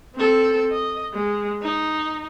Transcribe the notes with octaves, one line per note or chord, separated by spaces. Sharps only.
C4 A4
D#5
G#3
D#4